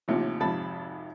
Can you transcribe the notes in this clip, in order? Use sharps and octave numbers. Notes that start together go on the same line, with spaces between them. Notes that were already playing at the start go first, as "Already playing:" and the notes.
A1 D#2 C3 F3
G#1 F2 C3 A5 B5